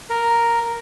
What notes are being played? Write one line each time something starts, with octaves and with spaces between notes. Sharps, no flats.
A#4